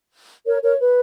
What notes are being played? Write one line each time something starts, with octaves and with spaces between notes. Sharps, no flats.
A#4 C#5
A#4 C#5
B4